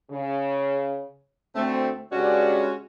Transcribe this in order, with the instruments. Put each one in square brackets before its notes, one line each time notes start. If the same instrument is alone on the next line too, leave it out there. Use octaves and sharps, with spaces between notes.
[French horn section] C#3
[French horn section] D2 C4 [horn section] A3
[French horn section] G2 C#3 D5 [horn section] G#3 C#4 F#4